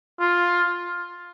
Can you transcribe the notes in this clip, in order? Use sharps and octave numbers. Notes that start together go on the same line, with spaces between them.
F4